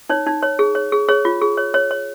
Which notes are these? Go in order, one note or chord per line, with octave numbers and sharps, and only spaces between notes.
D#4 C#5
D#4
C#5
G#4
C#5
G#4
G#4 C#5
F4
G#4
C#5
C#5
C#5